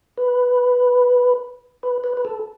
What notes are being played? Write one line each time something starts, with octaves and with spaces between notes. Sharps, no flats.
B4
B4
B4
B4
A4